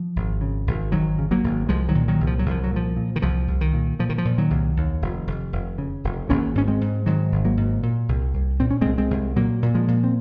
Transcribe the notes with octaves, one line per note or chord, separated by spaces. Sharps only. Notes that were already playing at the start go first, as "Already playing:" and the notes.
Already playing: F3
G#1
C#3
G#1
G#1 D#3 F#3
C#3
F#3 A#3
G#1
C2 F3 G#3
D#3 F#3
A#2
D#3 F#3
C2
F3
F#3
C2
F3
F#3
A#2 F3
A#2
D#3
C2 F3
C2
D#3
A#2
A#2 F3
D#3
F3
A#2
D#3 F#3
C2
D#2
F1
F1
F1
C#3
F1
G#1 A#3 C#4
G#2 C#4
G#3 C4
G#2
G#2 D#3 F#3
G#1
F#3 A#3
G#2
A#2
C2
C2
A#2 C4
C#4
C2 G#3 C4
G#3 C4
C2
A#2 F#3 A#3
A#2
F3 G#3
A#2
C4